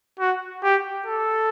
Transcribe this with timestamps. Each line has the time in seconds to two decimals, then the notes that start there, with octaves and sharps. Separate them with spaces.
0.19 F#4
0.63 G4
1.06 A4